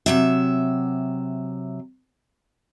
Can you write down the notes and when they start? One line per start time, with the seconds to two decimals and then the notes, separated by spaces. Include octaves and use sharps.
0.06 C3 F#3 E5